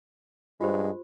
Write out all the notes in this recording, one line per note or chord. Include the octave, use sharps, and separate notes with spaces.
G2 G#3 F4 G4 C5